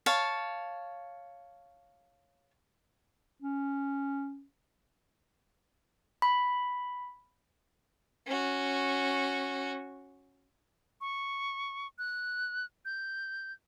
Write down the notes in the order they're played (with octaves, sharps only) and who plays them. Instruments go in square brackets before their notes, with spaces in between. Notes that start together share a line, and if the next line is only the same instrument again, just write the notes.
[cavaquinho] C#5 F5 A5
[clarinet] C#4
[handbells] B5
[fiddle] C#4 F#4
[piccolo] C#6
F#6
G6